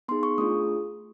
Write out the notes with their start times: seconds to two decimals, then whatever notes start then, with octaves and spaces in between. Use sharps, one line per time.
0.08 B3 D#4 G#4 C6
0.23 C#6
0.38 A3 D4 F4 G#4 D#6